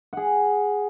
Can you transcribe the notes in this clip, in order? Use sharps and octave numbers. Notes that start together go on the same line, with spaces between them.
G#4 F#5